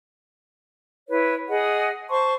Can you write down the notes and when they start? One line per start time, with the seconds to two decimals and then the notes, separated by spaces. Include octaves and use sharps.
1.08 E4 B4 C#5
1.48 G#4 D#5 F#5
2.09 C5 A5 C6 C#6